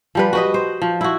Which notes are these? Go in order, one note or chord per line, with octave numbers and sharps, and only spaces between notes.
F3 G3 B4
F#4 B4 D#5
C5
F3
E4 F#4